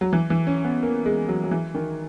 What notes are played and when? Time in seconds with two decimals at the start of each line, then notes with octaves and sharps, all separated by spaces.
0.01 F#3
0.13 E3
0.30 E3
0.47 C#4
0.64 B3
0.83 A#3
1.06 G#3
1.28 F#3
1.44 F#3
1.51 E3
1.74 D#3